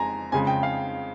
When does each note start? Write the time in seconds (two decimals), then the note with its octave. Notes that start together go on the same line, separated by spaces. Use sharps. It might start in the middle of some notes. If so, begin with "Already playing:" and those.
Already playing: F2 G#3 G#5 A#5
0.32 F2 C#3 G#3 G#5
0.47 G5
0.63 F5